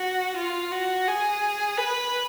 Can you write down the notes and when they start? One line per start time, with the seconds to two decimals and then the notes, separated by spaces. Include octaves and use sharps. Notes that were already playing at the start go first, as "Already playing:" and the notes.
Already playing: F#4
0.37 F4
0.72 F#4
1.07 G#4
1.78 B4